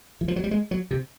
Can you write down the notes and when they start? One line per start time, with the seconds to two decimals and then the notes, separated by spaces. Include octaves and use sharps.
0.21 E3
0.28 F3
0.36 F#3
0.44 G3
0.51 G#3
0.71 F#3
0.91 C3